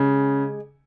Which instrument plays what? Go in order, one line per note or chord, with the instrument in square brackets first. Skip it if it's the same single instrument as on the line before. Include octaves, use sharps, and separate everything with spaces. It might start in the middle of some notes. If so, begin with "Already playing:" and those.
Already playing: [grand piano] C#3 [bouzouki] G#3 G4